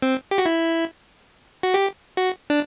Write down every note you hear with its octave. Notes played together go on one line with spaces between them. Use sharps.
C4
G4
F#4
E4
F#4
G4
F#4
D4